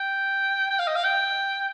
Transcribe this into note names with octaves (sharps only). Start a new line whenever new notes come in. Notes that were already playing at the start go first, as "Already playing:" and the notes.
Already playing: G5
G5
F5
D#5
F5
G5